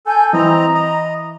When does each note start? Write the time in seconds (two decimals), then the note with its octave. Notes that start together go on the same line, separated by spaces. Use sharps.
0.06 A4 G#5 G6
0.33 E3 C4 D#5 A#5
0.75 D#5